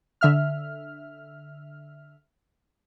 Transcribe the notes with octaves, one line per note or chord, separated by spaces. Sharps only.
D3 E5 F6